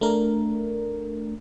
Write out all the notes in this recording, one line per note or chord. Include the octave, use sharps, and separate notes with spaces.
A3 D4 A#4